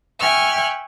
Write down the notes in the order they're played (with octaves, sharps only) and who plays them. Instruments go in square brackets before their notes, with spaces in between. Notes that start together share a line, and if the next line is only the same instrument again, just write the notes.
[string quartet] E5 G5 G#5 C#6 F6 F#6